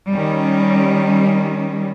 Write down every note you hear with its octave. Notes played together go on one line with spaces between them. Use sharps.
D#3 G3 C#4